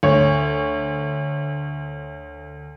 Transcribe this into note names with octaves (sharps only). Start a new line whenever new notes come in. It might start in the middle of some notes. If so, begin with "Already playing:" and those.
D2 C#5